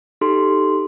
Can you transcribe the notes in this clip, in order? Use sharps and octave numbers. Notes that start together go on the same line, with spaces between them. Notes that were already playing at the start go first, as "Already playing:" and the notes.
D#4 G4 A4 C6